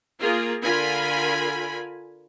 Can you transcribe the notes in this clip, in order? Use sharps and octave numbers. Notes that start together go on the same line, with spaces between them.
A#3 F4 G#4 A#4
D3 F4 A#4 G#5 B5